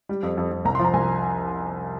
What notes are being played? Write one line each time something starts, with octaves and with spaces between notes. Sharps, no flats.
G3
F2
F2
F2
C2 A#5
C6
F3 A#5
C2 G#5